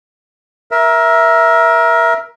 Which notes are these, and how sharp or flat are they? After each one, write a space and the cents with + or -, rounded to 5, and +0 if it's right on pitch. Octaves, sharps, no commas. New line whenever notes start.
A#4 +20 E5 +0